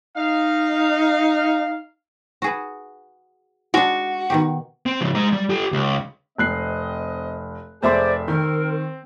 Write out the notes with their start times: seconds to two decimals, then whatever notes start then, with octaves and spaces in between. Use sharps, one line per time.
0.17 D#4 F5
2.42 F#4 G#4 B4
3.74 G#3 D4 F#4
4.30 B2 D#3 G4
4.86 C4
5.01 C#3 F3
5.15 G#3 A#5
5.32 G3
5.50 G4 A4
5.72 C#2
6.38 F1 C4 D#5 F#6 C7
7.83 F1 G#4 C5 D5 E5 C6
8.28 D#3 C4 A#4